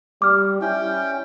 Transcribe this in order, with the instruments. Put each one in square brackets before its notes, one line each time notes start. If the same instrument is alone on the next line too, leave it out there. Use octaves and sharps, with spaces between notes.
[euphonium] G3 [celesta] D6 F6
[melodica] C#4 G5 [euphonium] E4